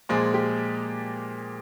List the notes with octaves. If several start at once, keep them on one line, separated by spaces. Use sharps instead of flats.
A#2 F3 G#3 G#4
G4